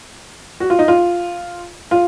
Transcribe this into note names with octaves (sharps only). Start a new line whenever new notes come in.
F#4
F4
D#4
F4
F4